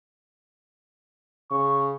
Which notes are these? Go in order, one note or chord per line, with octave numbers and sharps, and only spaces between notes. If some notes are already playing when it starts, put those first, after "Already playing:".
C#3 C#6